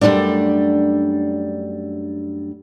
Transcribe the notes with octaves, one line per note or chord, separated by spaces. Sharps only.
F#2 F3 G3 A3 D4